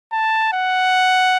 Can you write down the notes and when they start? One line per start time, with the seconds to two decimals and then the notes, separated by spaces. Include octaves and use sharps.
0.12 A5
0.53 F#5